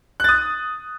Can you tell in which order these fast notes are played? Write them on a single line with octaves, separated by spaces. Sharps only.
F#6 A6 D#6